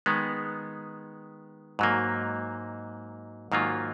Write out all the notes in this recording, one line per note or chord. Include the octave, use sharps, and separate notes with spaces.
D#3 G#3 B3
G#2 F#3 A#3
G#2 D#3 F#3 A#3 F4